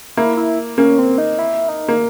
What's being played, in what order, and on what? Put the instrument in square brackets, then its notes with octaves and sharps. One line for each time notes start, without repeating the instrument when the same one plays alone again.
[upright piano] A#3 [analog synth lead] E4
[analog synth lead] E4
[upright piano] A#3 [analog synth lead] C#4
[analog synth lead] C4
D#4
E4
D#4
[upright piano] A#3